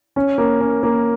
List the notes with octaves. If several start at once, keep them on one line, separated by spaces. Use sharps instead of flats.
C#4
A#3
C#4
A#3